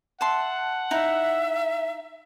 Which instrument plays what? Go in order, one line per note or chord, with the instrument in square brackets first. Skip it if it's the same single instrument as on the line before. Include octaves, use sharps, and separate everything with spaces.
[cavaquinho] E5 A5 C6 [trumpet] F#5
[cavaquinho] D#4 E4 [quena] E5